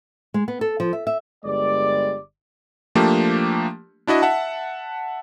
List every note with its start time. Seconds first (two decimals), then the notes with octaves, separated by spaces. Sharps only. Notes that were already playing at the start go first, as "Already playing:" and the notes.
0.34 G#3
0.48 B3
0.61 A4
0.80 F3
0.93 E5
1.07 E5
1.45 G1 G3 G#3 D5
2.95 F3 A3 A#3 D4 G4
4.07 D4 E4 F#4 D#5
4.22 E5 F#5 A5